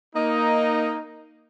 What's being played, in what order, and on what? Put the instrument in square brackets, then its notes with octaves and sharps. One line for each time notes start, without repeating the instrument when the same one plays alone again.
[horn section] A#3 D#4